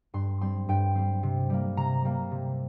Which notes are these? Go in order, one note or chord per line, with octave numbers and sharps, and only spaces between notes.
G2 C6
G3 C4 C6
G2 G5
G3 C4
C3
G3 A#3
C3 A#5
G3 A#3
C3